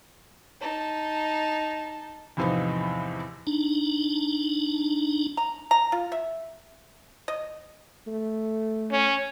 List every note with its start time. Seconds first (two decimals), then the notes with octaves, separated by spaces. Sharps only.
0.61 D#4 A5
2.37 E2 A2 C3 F3 B3 D#4
3.47 D4 D#4
5.37 A#5
5.71 A#5
5.92 F4
6.12 E5
7.28 D#5
8.07 A3
8.92 C#4